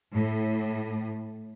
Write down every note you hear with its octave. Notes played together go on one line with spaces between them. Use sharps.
A2